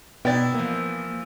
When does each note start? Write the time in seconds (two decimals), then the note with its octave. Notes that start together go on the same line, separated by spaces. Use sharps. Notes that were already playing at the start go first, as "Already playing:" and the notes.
0.25 B2 B3 D#4 E4 D5 G5 A6
0.54 E3 F3 A#3